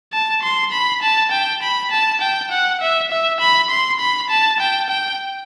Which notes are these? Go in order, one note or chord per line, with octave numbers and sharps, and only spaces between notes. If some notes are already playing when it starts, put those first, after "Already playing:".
A5
C6
B5
A5
G5
B5
A5
G5
F#5
E5
E5
B5
C6
B5
A5
G5
G5